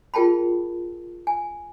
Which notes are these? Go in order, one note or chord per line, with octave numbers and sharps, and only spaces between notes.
F4 G#4 A#4 G5 A5 B5
G#5